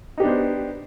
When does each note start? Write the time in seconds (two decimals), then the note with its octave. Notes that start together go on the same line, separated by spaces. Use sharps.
0.18 D#4
0.20 G4
0.23 D4
0.25 B3
0.28 C5